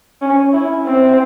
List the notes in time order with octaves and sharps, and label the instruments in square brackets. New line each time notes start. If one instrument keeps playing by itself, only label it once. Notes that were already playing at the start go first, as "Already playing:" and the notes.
[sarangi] C#4
E4
C4